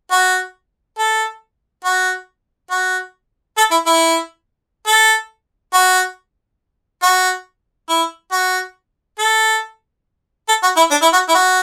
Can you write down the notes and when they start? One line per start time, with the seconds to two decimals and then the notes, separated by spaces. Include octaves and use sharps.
0.11 F#4
0.98 A4
1.85 F#4
2.71 F#4
3.58 A4
3.71 E4
3.86 E4
4.87 A4
5.74 F#4
7.03 F#4
7.89 E4
8.32 F#4
9.19 A4
10.49 A4
10.63 F#4
10.77 E4
10.91 D4
11.02 E4
11.13 F#4
11.29 E4
11.35 F#4